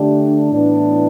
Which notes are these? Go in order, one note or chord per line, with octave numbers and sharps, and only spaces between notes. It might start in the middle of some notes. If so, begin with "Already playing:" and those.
Already playing: D3 A3 D4 G4
A2 E3 B3 D4